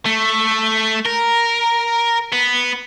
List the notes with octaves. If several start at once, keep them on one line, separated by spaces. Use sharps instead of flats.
A3
A#4
B3